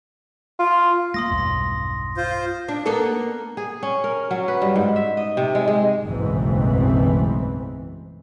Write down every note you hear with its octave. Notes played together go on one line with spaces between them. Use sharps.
F4
A3 A#3 C6 D#6 A#6
B1 E2 G2
F4 C5
D4
A#3 B3 A4
G#4
C#4
A#4
F#3
B4
G2
G#2
E5
D#5
C3
G#3
G#3
F#1 B1 G#2 E3 A3 C4